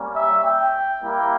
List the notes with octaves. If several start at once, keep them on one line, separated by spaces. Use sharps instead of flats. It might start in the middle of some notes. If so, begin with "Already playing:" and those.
Already playing: G3 A#3 C#4
E5
G5
G3 A#3 E4